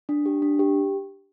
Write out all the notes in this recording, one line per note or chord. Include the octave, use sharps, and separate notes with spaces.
D4
G4
D4
G4